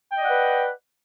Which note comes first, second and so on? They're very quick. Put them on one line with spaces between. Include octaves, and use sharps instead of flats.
G5 D#5 D5 F#5 B4